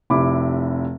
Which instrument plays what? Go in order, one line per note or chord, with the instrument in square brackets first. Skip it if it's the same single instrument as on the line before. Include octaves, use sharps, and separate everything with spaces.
[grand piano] F1 E4 G4 B5 D6